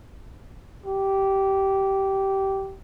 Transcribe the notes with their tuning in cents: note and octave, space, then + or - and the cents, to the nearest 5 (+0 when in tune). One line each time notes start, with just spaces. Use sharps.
G4 -15